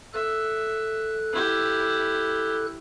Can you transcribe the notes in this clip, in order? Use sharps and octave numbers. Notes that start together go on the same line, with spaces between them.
A4 E5 F#6
E4 G4